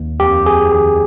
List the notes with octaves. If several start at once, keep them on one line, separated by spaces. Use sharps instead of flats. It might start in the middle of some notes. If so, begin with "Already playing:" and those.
Already playing: D#2
F2 G4
F2 G#4
D#3 G#4